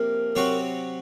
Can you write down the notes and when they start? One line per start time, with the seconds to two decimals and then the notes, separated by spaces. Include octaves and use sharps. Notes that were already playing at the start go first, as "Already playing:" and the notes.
Already playing: C3 F3 A#3 A#4
0.35 C3 F#3 C4 F#4 C#5